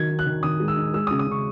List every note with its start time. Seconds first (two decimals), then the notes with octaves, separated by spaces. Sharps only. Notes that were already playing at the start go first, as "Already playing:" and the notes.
Already playing: D#3 F#3 G#6
0.10 D#4
0.19 F#6
0.26 D#3
0.43 D#3 D#6
0.60 G#3
0.68 E6
0.76 D#4
0.94 G#3 E6
1.07 D#6
1.11 C#3
1.19 D#6
1.27 C#3 C#6